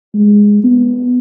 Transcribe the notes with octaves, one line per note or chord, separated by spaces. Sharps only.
G#3
B3